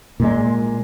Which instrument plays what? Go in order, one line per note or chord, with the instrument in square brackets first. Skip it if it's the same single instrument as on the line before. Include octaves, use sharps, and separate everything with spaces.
[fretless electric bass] A#2 G#3